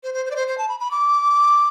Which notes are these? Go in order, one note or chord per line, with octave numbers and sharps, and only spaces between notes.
C5
C5
C5
D5
C5
C5
A5
B5
B5
D6